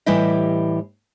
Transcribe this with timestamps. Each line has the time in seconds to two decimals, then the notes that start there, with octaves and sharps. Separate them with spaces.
0.06 A2 E3 G3 E4 G4 D#5